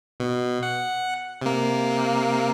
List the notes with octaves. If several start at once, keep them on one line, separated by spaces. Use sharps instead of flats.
B2
F#5
C3 A#3